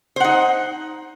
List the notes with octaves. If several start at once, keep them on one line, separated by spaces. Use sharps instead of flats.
D#4 C5 F#5